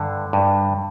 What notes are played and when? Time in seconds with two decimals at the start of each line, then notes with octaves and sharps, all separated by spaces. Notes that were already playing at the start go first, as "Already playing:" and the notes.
Already playing: G2 D3
0.33 G2